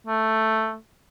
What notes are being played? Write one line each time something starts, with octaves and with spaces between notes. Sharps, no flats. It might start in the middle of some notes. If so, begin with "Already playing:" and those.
A3